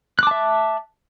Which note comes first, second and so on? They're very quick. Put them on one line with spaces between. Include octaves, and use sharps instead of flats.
F#6 D6 A5 E5